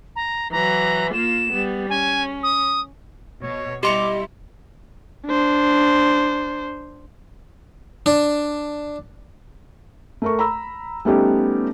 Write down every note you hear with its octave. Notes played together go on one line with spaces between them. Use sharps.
A#5
E3 F#3 A#5
A#3 F4 E7
G3 B3
C#4 G#5
D#6
B2 C#5
G3 E4 G4 D#5 C6 D6 C#7
D4 C5
D4
A3 A#4 C#6
A#5 B5 E6
G3 A3 B3 C#4 D#4 G4